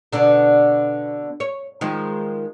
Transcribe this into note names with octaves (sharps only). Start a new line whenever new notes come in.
B2 D3 D4
C#5
D#3 F3 G#3